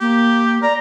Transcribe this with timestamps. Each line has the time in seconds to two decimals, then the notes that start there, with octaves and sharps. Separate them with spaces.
0.01 A#3 G4
0.62 D5 A#5